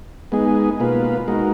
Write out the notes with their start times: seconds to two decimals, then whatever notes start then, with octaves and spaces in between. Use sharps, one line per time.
0.32 G#3 B3 D#4 G#4
0.80 B2 A#3 F4 B4
1.28 G#3 D#4 F#4 A#4